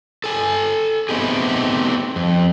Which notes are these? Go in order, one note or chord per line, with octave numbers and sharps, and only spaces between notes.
A4 G#5
A3 B3 C4 D#4 G4 G#4
F2